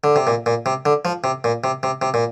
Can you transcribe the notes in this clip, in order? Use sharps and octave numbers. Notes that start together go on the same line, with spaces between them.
D3
C3
A#2
A#2
C3
D3
F3
C3
A#2
C3
C3
C3
A#2